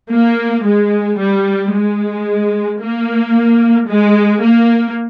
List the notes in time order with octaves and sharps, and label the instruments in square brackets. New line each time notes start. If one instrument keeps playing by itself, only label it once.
[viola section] A#3
G#3
G3
G#3
A#3
G#3
A#3